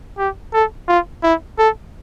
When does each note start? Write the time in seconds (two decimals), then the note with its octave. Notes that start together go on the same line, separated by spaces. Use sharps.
0.18 G4
0.53 A4
0.88 F4
1.23 E4
1.58 A4